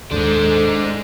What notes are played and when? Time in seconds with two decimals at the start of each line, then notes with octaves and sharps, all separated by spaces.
0.11 D#2 G#2 G#3 D4 A4 C5